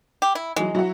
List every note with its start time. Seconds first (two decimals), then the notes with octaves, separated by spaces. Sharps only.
0.22 G4
0.35 E4
0.56 E3 F#3 G#3
0.75 F#3 E4 F#4